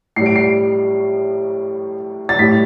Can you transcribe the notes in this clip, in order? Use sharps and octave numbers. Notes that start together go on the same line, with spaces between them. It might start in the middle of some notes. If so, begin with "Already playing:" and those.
A2 G3 C7
D7
C7
A6
A2 G3 B6